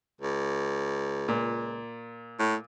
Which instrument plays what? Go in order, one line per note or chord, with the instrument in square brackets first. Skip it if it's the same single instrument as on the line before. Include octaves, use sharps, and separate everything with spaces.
[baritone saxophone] C#2
[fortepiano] A#2
[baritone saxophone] A2